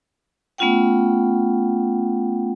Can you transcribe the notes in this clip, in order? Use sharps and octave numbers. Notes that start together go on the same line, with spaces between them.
A3 B3 C#4 F4 F#5 G5